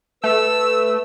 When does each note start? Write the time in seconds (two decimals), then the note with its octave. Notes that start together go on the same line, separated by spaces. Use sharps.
0.24 A3 B4 E6